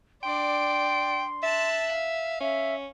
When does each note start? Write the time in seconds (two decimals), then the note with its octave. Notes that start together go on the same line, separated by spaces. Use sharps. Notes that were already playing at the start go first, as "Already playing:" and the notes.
0.23 D4 D5 G5 C6
1.43 E5 A5 F#6
1.92 F5
2.40 C#4 E5